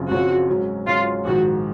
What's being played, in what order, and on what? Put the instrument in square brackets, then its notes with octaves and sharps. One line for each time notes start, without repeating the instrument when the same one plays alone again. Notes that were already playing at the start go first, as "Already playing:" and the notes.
Already playing: [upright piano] F#1 F#2 C#3 F3 C4
[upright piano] F#1 F#2 C#3 F3 C4 [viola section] F#4
[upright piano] G#2 F#3 C#4
[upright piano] G#2 F#3 C#4 [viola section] F4
[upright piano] A#1 G#2 D#3 [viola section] F#4